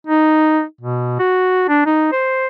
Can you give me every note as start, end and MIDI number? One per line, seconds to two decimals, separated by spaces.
0.07 0.63 63
0.81 1.17 47
1.19 1.67 66
1.68 1.82 62
1.86 2.11 63
2.12 2.48 72